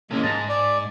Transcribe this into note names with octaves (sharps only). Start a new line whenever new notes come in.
C3 E3 G#3 A#3 C#4
G#2 A5 A#5
D5